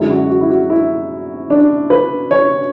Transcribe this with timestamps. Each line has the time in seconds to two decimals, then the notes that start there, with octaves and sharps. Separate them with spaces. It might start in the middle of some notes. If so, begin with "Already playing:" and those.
Already playing: F#2 D3 G#3 E4
0.10 F#4
0.30 F#4
0.41 E4
0.50 F#4
0.70 E4
1.50 D4
1.90 B4
2.31 C#5